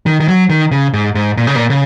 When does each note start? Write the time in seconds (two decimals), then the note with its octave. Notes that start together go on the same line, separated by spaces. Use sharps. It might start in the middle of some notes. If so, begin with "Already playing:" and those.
0.06 D#3
0.20 D#3
0.28 F#3
0.50 D#3
0.71 C#3
0.93 G#2
1.15 G#2
1.37 A#2
1.47 C#3
1.56 A#2
1.70 C#3